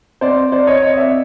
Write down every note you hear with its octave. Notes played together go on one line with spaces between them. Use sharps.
C4 C5 D5
C4 C5 D5
C#5 D#5
C4 C#5 D#5
D5 E5